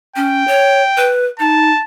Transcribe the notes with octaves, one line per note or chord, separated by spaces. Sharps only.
C#4 G5
C#5
B4
D#4 A5